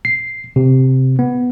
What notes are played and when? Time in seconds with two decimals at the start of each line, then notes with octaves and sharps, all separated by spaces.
0.05 C7
0.56 C3
1.19 B3